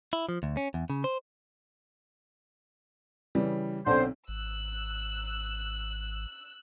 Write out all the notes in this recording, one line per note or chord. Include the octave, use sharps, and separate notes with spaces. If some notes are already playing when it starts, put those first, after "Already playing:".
E4
F3
D2
C#4
E2
C#3
C5
C#3 E3 G3
B1 D3 C4 C5
G#1 E6 F#6